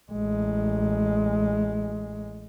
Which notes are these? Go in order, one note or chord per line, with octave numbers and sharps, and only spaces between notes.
A1 G#3